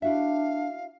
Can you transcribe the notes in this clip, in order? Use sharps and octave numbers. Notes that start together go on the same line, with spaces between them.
D4 E4 F#4 E5 F5